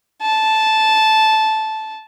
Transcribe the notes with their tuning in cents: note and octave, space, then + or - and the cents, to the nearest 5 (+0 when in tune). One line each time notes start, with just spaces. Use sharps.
A5 -10